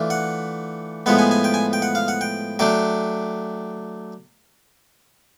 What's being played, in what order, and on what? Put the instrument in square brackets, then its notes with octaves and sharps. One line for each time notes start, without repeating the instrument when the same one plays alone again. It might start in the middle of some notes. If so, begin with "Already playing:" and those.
Already playing: [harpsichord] E3 A3 D4 F4
F#5
A2 F3 G#3 B3 F#5
G#5
G#5
G5
G#5
G5
F#5
F5
F#5
G5
F#3 A3 D4 G5